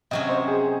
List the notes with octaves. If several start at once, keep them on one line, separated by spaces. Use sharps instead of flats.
C3 F#3 C#4 D#5
C5
G#4